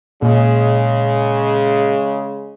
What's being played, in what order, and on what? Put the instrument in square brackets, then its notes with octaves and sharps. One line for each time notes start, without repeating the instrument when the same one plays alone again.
[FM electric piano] A#2 [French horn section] C#3 G#3